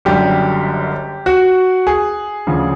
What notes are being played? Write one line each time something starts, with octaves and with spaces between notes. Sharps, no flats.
F#1 F#2 D3 G3 G4
F#4
G#4
D2 C#3 F3